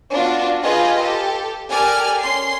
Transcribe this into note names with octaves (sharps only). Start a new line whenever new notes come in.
B3 D4 F4 F#4
F4 G4 G#4 B4 D#5 G5
G4 A4
G4 A4 A#4 D5 G#5 F6
C#4 C6 C7